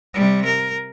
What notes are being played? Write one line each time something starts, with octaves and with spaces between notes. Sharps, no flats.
C3 G3
A#4